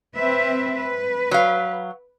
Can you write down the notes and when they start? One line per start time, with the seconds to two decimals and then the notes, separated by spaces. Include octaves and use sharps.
0.17 C4 B4 E5
0.80 B4
1.31 F#3 F5